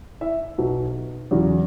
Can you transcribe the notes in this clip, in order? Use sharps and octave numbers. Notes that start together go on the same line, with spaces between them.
E4 E5
B1 B2 F#3
E2 C#3 F#3